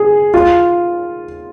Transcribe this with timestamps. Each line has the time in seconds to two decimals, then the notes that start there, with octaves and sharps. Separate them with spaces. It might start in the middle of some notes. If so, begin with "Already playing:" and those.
Already playing: G#4
0.34 F4